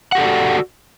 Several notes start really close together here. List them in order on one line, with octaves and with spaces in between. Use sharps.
F#5 G4 A4 D5 F#4